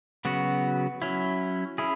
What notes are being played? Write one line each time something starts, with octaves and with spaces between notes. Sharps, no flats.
C#3 F#3 B3 F#4
F#3 C#4 E4
C#4 E4 G#4